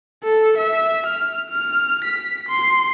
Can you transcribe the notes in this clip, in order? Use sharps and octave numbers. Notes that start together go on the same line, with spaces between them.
A4
E5
F6
F6
B6
C6